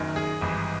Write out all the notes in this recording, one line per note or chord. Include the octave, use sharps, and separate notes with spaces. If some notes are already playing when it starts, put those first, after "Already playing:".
Already playing: F#1 F#2 D#3
G#4
G#1 G2 E3